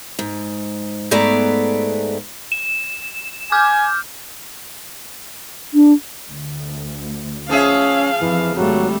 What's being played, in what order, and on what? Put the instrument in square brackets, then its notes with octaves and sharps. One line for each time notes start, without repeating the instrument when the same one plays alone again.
[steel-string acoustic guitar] G#2
G#2 A3 B3 G#4 D5 A#5
[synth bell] E7
[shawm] G#5 [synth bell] D6 F6 G6
[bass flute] D4
[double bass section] D2
[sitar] F3 G#4 E5 [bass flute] C#4 [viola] F5
[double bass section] F2 [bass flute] E3
[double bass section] G#1 [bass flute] F#3 [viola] G3 A3